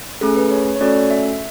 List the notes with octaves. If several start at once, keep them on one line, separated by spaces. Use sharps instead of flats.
A3 C#4 G#4 A4
B4
C#5
C#5
A3 C#4 F#4 A4 D5
E5